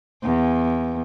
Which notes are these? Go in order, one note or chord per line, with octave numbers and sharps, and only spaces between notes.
E2